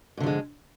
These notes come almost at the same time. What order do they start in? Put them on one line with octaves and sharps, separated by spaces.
G#2 D3 F3 G#3